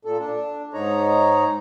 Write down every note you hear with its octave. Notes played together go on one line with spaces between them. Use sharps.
A#2 A4
D4
G#2 D#4 C#5 A#5